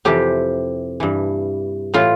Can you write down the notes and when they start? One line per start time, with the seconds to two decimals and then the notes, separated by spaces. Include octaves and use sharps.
0.05 F2 C3 E3 G4
1.00 G2 E3
1.94 A2 E3 F4